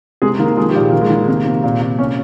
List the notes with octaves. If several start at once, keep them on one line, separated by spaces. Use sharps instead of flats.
C3 G#3 G#4
D#3 A#3 A#4
F3 G#3 G#4
G4
A#2
G#4
D#3 A#4
G#3 G#4
D#3
C3 A#3 A#4
C3
A#2
A#2
C3 C#4 C#5